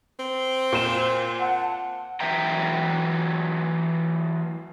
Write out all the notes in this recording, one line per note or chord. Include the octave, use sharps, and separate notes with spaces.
C4
A#2 C5 E7
F#5 A5
E3 F#3 E5 G5 A#5